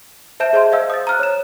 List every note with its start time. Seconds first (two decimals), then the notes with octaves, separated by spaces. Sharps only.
0.40 C5 E5 A5 G6 E7
0.53 G#4 C5 D#5 A5 C6
0.72 C5 D#5 F5 E6 G6
0.90 D#6 A6
1.07 A#5 F6 F#6
1.19 C#5 E7